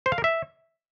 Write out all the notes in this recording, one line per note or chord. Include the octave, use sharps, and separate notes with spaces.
C5
F5
A#4
E5